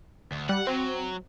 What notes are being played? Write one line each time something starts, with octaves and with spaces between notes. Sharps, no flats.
D2
G3 F#5
F#3 C4